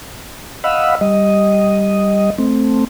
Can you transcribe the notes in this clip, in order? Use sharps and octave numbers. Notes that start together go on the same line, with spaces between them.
D#5 F5 F#5 B5 E6
G3 D#5
A3 C4